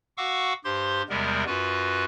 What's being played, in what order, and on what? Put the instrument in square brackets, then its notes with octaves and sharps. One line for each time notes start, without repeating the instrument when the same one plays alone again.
[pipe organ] F#4 F5 F#5 C#6 D6 E6
G2 G4 C5 C6
E2 C3 G3 G#3 B3 A#4
F#2 F4 F#4 B4